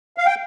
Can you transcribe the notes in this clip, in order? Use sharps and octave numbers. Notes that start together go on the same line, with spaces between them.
F5
G5